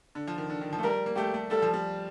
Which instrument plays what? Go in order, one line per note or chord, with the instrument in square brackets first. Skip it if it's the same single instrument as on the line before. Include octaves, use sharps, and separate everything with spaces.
[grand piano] D3
F3
D#3
D3
D#3
F3
A3
[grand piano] G3 [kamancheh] A#4
[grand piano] A#3
[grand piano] A3 [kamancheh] G4
[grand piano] A3
[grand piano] G3 [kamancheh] A4
[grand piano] F3
G3